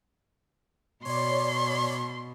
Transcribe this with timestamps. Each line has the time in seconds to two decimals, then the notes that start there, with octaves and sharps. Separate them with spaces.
1.05 B2 C#5 D5 C6